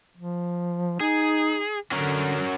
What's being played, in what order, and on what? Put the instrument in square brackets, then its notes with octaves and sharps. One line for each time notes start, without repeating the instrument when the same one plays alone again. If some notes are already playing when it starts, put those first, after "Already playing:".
[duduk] F3
[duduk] D#4 [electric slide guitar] G#4
[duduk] D3 [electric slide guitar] F#3 C#4 A#4